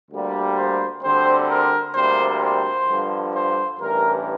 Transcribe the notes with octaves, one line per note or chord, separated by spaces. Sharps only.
D2 D3 G3 A#3
C5
D2 D3 G3 C4 C5
A#4
D2 C3 G3 A#3 C5
C5
G2 D3 F3
C5
A1 G2 E3 A#4